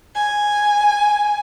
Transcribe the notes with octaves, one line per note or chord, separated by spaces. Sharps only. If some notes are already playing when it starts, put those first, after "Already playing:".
G#5